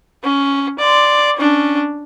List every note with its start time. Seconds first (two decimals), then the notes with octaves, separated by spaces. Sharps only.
0.24 C#4
0.79 D5 C6
1.37 C#4 D4